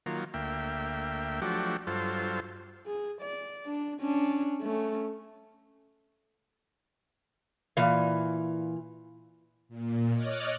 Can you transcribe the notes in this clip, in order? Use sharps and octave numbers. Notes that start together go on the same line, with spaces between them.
D#3 F#3 A#3 F4
D2 A#3 E5 G5
F3 F#3 A3 D4 F#4 G4
G2 F#3 F4 A4 C5
G#4
D5
D4
C#4 D4
A3 C#4
A#2 E3 F5
A#2
C#5 D#5 D6 F6 F#6 A6